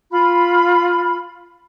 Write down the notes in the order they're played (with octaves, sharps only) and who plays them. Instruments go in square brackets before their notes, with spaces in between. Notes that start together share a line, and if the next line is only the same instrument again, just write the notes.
[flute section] F4 B5